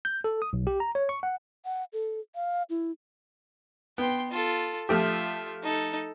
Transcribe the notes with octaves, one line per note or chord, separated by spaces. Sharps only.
G6
A4
D#6
B1
G4
A#5
C#5
C#6
F#5
F#5
A4
F5
E4
B3 G5 C6
F4 A4
F3 A3 F4 G4 E5
D#4 A4